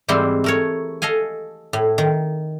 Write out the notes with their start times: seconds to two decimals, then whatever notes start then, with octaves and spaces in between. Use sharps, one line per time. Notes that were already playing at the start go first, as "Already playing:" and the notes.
0.08 G#2 E3 G3 C4 E4 C6
0.44 A3 A#4 C#5
1.02 A4 D#5 F5 G#5
1.73 A2
1.98 D#3